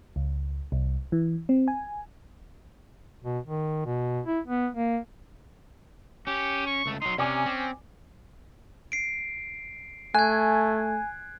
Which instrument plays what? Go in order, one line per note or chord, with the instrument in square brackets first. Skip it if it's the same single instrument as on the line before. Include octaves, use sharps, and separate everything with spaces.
[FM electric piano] C#2
C2
E3
C4
G#5
[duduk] B2
D#3
B2
E4
B3
A#3
[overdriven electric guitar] C#4 [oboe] G4
[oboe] C#6
[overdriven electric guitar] C#2 A3
[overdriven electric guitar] F#3 D#4 [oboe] C6
[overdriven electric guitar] C3 [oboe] C#4 [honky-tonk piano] D5 G#5 D6
[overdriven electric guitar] C4
[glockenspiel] C7 D7
[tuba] A3 [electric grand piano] G#5 [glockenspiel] F#6 G#6